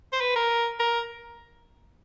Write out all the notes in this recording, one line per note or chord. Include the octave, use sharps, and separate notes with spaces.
C5
B4
A#4
A#4